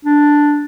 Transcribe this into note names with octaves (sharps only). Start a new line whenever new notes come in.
D4